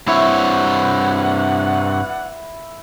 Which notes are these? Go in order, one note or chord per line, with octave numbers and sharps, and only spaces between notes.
G2 C4 E4 B4 C#5 D5 F#5